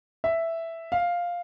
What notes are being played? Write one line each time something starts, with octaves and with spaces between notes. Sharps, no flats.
E5
F5